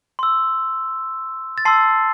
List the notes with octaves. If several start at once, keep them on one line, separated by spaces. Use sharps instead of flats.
C6 E6
A6
A5 C6 E6 C7